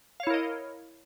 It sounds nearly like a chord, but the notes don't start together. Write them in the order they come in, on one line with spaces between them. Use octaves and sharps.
F5 C#5 E4 A#4 D#5